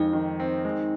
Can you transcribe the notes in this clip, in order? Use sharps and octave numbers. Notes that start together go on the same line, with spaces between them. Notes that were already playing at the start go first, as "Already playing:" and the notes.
Already playing: F2 D#3 G#3 C4 D#4
D#3
C4
G#3